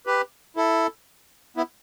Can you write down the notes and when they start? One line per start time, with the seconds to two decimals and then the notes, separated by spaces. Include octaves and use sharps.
0.06 G4 B4
0.56 E4 A4
1.57 B3 E4